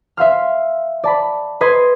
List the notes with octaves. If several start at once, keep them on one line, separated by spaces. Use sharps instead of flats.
E5 F5 C6 F6
D5 A5 B5
B4 D#5 C6 G#6